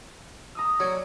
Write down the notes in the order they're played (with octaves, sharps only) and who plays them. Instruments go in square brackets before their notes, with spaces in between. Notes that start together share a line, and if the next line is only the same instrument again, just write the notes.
[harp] A#5 D#6 E6
[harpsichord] F#3 [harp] D5 G#6 C#7